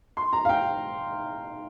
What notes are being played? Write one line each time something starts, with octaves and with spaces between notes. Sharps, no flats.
C6
A#5
F5
G5